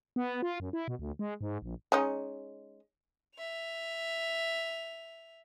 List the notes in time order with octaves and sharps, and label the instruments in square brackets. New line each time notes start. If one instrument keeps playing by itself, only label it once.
[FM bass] B3
F4
F#2
E4
B2
D2
G#3
G#2
A#1
[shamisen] G#3 C#4 D#4
[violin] E5 F7